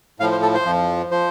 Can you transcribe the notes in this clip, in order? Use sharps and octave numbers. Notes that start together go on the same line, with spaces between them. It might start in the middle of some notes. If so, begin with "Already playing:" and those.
A2 F3 F5
C5
A4
C5
F2 F3
F3 C5